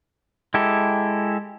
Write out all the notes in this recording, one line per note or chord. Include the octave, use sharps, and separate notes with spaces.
G#3 E4 G4 A4